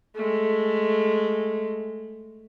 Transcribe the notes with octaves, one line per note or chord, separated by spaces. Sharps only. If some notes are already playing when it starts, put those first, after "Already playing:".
G#3 A3